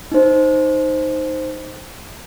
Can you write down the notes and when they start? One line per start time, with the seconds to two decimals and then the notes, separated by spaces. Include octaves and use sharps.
0.12 D#4 C5